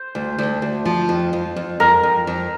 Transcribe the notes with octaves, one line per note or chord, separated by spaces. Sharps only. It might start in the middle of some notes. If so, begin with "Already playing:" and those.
Already playing: C5
D2
D2
D2
F3
F2
F2
F2
F2 A#4
F2
F2